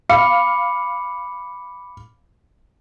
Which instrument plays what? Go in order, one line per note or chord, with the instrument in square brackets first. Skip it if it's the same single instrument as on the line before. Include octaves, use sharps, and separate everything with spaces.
[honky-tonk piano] F5 [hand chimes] B5 D6 C#7